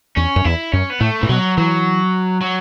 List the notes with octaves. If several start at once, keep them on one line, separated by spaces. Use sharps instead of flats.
E2 C#4
F#2
E2 E4
F#2 C#4
B3
A2 A3
A2 E3
B2 F#3
E3 F#3
F#3